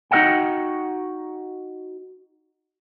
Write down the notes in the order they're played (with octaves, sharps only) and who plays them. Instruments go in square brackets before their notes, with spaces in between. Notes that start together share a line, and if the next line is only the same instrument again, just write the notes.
[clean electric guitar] D#4 F#4 A#4 D#5 F#5 G5